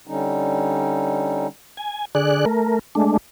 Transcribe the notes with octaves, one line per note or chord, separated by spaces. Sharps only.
D3 G3 C#4 D#4
G#5
D3 G#4 D5 F#6
A3 A#4
G#3 A3 D4